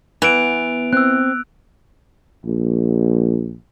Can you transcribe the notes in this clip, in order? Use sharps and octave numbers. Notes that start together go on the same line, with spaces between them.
E3 B3 D7 F7
C4 E6 F#6
A#1